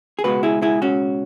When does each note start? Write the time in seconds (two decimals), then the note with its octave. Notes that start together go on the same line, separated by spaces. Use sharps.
0.19 G#4
0.24 C#2 B2 G#3 F#4 B4
0.43 E4 G#4
0.62 E4 G#4
0.82 C#4 F#4